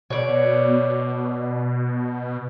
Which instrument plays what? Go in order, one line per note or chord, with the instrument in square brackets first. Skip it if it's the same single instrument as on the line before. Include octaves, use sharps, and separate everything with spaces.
[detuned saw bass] B2 [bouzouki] C#5 D5